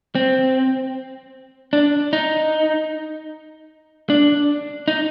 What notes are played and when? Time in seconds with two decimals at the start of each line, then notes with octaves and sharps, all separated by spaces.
0.15 C4
1.73 D4
2.13 D#4
4.10 D4
4.88 D#4